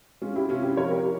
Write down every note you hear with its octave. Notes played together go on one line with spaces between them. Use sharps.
G#3 C#4 F4
E4 G4
C3 C#4 F4
E4 G4
F3 A#4 C#5
G4 A#4